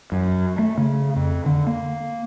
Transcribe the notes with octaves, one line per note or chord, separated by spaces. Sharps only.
F#2
A3
C#3
F2
D3
A#3